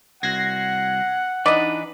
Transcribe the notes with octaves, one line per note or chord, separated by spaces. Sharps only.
C2 F#4 F#5 G#6 A#6 C7
E3 D4 D#4 B4 D5 D#5